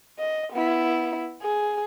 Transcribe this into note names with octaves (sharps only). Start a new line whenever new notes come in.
D#5
B3 E4
G#4